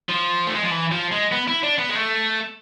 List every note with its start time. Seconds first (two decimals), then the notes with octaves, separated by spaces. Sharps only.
0.09 F3
0.47 A3
0.55 G#3
0.63 F3
0.71 E3
0.92 F3
1.12 G#3
1.32 B3
1.48 E4
1.63 D4
1.78 B3
1.89 G#3
1.95 A3